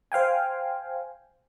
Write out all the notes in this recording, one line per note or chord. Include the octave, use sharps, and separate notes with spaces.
C5 F5 G5 G#5